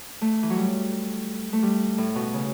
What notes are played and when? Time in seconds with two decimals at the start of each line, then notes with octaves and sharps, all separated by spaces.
0.21 A3
0.43 E3
0.50 F#3
0.57 G3
1.53 A3
1.63 G3
1.98 A2
2.15 B2
2.33 C#3